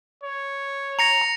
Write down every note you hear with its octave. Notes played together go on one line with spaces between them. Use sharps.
C#5
A#5 A#6 C#7 F7